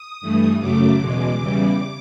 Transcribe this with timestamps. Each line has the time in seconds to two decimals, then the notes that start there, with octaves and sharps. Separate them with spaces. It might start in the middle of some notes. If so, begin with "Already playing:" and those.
Already playing: D#6
0.21 G2 E3 A3
0.60 F#2 C#3 F#3 A3 D6
0.99 E2 B2 G#3
1.37 E2 C#3 E3 G3